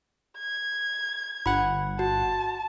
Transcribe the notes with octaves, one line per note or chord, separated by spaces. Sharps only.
G#6
G1 F#5 B5
F#4 A5